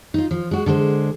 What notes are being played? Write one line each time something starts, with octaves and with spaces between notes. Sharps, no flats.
D#4 F4
F3
G#3 F#4
D3 G#3 A4 C5